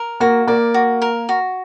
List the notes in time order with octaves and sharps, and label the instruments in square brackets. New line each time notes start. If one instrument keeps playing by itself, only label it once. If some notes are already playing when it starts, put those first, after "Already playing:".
Already playing: [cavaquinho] A#4
[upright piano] A#3 [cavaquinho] F#4
[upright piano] A#3 [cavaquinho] D5
[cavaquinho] F#4
A#4
F#4